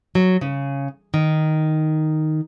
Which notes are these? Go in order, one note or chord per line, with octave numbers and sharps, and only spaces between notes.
F#3
C#3
D#3